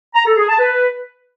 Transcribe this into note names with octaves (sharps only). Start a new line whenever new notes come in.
A#5
A4
G#4
A5
B4